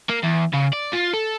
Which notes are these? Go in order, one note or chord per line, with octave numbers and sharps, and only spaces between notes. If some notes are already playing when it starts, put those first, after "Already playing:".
A#3
E2
C#3
D5
F4
A4